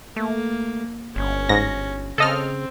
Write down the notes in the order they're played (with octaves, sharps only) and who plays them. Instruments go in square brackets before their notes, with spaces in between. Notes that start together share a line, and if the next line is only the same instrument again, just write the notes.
[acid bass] A3 [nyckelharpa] A#3
[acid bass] G1 [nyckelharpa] C#4
[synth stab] G#2 A#6
[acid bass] C#3 [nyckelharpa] C4 [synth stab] A4 D#5 F6